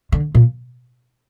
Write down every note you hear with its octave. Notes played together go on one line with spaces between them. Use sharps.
D3
A#2